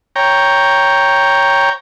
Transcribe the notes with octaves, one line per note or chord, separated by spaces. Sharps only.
C#5 G5 A#5